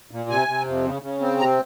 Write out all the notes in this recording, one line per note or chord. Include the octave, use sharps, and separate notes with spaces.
A#2
C3 G#5
C3
F2
C#3
C#3
C4
C3 A#5